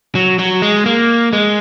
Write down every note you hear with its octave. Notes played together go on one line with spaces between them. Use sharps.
F#3
F#3
G#3
A#3
G#3